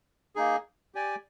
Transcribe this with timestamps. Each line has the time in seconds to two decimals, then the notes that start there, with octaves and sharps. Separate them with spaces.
0.36 A#3 D#4 G#4
0.95 G4 D5 G#5